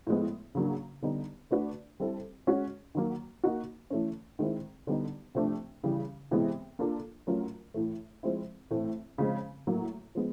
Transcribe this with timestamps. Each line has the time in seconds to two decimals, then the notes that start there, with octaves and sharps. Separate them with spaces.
0.07 A2 F3 G#3 B3
0.55 C#3 F#3 A#3 D4
1.02 D3 G3 B3 D#4
1.51 A3 D4 F#4 B4 D5
2.00 G3 C4 E4 A4
2.47 G#3 C#4 F#4
2.95 D#3 F#3 A#3
3.44 A#3 D#4 F#4
3.90 E3 A3 C#4
4.39 D#3 G#3 C4 E4
4.87 D3 G3 B3 D#4
5.35 C3 F3 A3 D4
5.84 C#3 E3 G3
6.31 C3 E3 G#3 B3
6.79 A#3 D4 F4 A4
7.27 F#3 A3 C#4 F4 A#4
7.74 A2 E3 A3
8.23 F3 G#3 C4 E4
8.71 A2 E3 A3 C4
9.18 C#3 F3 G#3 C4
9.67 A2 F#3 A#3
10.15 F3 G#3 B3